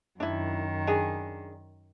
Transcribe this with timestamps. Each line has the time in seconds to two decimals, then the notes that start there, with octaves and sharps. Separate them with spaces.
0.20 F#2 D#3 D4 E4
0.87 D4 G#4